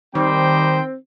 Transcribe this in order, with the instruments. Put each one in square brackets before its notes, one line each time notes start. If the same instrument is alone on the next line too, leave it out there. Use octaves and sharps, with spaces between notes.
[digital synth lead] D#3 [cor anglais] G3 [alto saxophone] C4 [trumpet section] D#4 C5 G5